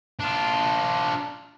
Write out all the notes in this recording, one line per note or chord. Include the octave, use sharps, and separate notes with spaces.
D4 F4